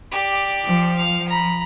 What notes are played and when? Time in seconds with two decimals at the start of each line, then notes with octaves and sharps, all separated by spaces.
0.11 G4 D5
0.63 F3
0.96 F5
1.28 A#5 B5